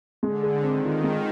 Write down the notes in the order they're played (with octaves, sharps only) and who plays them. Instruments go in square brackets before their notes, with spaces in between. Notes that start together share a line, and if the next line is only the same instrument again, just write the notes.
[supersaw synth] D3 [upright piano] G#3
[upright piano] G#4
[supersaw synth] D#3 [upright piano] C4
[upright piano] F4
G#3